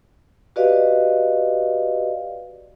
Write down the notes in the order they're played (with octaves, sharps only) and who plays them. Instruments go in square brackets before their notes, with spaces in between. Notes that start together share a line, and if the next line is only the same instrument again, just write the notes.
[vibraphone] F#4 G4 B4 D5 D#5 F5